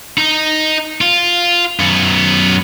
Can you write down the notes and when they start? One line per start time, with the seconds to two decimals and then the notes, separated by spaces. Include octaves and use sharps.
0.18 D#4
1.01 F4
1.80 F#2 B3